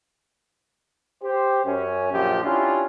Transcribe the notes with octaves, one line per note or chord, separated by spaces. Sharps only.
G4 C5
F#2 C#4
A#1 F#2 F3 G4
C#4 D4 E4 F4 G4